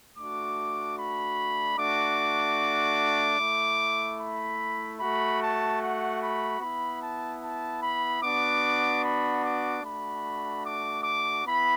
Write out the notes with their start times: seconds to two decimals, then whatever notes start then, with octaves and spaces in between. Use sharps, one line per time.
0.16 A3 D4 F#4 D6
0.96 B5
1.77 A3 D4 F#4 D6
3.39 A3 E4
4.19 B5
5.00 A3 F#4 B5
5.40 A5
5.80 F#5
6.21 B5
6.60 B3 E4 B5
7.01 A5
7.42 A5
7.82 B5
8.22 B3 D4 F#4 D6
9.03 B5
9.43 D6
9.83 A3 D4 F#4 B5
10.64 D6
11.04 D6
11.44 B3 E4 B5